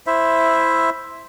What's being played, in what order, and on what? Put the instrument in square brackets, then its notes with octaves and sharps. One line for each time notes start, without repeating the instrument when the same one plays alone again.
[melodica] E4 C5 E5